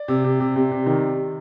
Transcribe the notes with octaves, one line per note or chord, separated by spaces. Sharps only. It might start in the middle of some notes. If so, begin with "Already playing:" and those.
Already playing: D5
C3
C3
C3
C3
C3
D#3